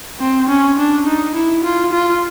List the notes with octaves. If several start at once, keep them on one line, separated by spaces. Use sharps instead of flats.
C4
C#4
D4
D#4
E4
F4
F4